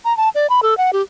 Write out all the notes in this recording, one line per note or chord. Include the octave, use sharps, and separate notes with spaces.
A#5
A5
D5
B5
A4
F#5
G4